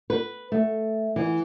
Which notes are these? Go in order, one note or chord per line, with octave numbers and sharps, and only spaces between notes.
B4
A3
E3